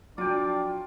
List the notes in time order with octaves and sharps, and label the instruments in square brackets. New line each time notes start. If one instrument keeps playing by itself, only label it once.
[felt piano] F3 F#3 [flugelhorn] D4 [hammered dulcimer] F4 G5 [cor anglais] D5